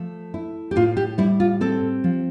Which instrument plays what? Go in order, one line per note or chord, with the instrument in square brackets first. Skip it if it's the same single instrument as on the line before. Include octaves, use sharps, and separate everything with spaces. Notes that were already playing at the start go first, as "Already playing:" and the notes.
Already playing: [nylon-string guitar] F3 A3
E4
G4
A2 F4
G4
G3 E4
F4
C4 A4
F3